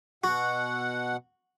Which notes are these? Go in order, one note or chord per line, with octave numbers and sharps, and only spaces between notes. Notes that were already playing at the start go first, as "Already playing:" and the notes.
B2 F#4 F#5